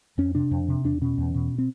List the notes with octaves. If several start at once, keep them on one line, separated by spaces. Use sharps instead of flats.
F2 C#4
C3 D4
F2
C3
E2 D4
B2 C#4
E2
B2
C4